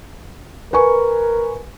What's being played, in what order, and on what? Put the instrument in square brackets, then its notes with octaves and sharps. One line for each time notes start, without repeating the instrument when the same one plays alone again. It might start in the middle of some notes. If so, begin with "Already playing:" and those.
[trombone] A#4 [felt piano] B4 G#5 C#6